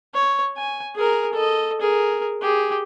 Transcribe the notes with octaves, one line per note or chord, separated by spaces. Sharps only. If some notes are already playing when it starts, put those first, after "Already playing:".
C#5
G#5
G#4 A#4
A4 D#5
G#4 A#4
G4 G#4